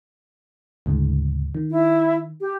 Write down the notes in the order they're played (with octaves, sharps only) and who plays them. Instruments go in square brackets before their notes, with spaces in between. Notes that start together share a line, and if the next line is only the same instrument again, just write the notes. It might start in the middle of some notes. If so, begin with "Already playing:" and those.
[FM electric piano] D2 G#2 C#3
D#3
[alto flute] E4
G4